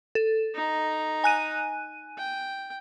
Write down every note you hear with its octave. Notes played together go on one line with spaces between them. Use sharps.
A4
D#4 A#5
G#5 F#6 D#7
G5